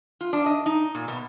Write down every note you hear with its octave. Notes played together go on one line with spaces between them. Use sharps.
F4
D4
D#5
D#4
A#2
B2